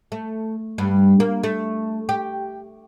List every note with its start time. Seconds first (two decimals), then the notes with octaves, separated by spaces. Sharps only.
0.12 A3
0.78 G2
1.20 A#3
1.43 A3
2.09 G4